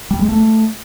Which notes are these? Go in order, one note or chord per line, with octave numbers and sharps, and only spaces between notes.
G3
G#3
A3